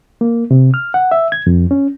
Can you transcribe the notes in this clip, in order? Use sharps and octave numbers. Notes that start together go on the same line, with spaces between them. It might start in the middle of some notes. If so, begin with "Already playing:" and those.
A#3
C3
F6
F#5
E5
G#6
F2
C#4